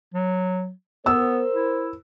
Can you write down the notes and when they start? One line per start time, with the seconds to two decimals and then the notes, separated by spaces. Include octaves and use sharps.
0.14 F#3
1.06 B3 A#4 C5 E6
1.54 E4